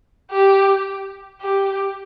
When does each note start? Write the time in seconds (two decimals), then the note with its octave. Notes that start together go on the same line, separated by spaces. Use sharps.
0.31 G4
1.41 G4